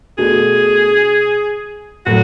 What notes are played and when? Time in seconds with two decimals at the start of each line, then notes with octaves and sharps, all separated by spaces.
0.18 B2 A3 D4 F#4 G#4
2.06 A2 F#3 A3 F#4